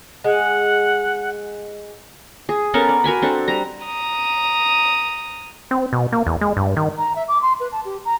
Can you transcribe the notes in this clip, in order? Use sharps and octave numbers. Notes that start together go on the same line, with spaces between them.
G#3 F#5
G#4
B3 C#4 A4 A#4
D5
F#4 A#4 G#5 B5
C4 D4 A4
G3 A#5
A#5 D#6
C4
B2
A#3
E2
G#3
G2
D#3
A#5
E5
D6
C6
B4
A5
G4
A#5